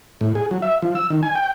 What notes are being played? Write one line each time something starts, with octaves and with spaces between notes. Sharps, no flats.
A2
G#4
F#3
E5
F3
E6
D#3
G#5
G5